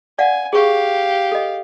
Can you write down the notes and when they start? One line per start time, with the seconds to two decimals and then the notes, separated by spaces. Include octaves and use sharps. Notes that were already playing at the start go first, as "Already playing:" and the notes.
0.19 D5 F5 F#5 G#5
0.53 G4 G#4 F5 C#6
1.32 A4 D#5